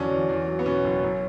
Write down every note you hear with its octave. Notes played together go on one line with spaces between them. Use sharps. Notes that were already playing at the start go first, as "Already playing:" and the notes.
Already playing: E2 D3 F#3 C#4 D4
E2
E2
F#3
B3
B2 C#4
F#1
F#2